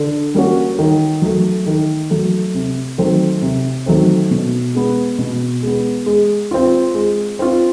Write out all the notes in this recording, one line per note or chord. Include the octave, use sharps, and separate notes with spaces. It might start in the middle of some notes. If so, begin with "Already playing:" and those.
Already playing: D3
G3 A#3 C#4 F#4
D#3
F#3 A3
D#3
F#3 A3
C3
D#3 F#3 A3 C4
C3
D#3 F#3 A3 C4
B2
G#3 B3
B2
G#3 B3
G#3
C4 F4
G#3
C4 F4